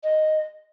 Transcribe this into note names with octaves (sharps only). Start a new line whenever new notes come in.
D#5